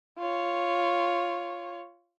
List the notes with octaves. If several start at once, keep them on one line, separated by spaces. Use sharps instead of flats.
F4 C#5